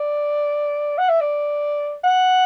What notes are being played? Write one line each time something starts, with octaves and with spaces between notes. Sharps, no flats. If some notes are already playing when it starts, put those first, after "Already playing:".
Already playing: D5
F#5
E5
D5
F#5